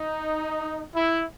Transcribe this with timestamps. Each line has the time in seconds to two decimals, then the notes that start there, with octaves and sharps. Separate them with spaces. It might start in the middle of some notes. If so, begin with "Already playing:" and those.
Already playing: D#4
0.95 E4